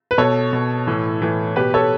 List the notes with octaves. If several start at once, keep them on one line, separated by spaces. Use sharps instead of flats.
B4
B2 A4 C#5
B2
A2 E3
A2 E3
B2 G4 B4
A4 C#5